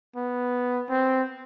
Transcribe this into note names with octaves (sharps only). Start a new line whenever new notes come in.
B3
C4